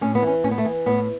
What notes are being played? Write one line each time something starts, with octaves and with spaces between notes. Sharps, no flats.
A2 C#4
B3
E3 C#4
A2 C#4
B3
A3
E3 B3
A2 B3